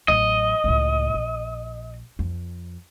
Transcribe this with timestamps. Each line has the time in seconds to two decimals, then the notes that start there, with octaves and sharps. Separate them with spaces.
0.08 A1 F#3 D#5
0.64 C#2 A2
1.14 A#1
2.19 F2